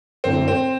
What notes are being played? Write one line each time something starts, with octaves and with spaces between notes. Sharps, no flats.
F#2 D3 A3 C4 E4
C4